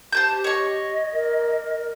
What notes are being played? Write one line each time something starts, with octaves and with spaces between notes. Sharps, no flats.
G4 C5 A5 G6
C#5 D#5 C#6
A#4